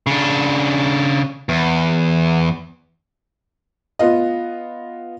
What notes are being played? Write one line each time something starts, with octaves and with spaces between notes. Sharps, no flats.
C#3 D4
E2
B3 F4 D#5